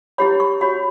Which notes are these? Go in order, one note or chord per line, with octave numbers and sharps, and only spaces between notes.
E4 G4 C#5 B5
C#6
F#4 C#5 B5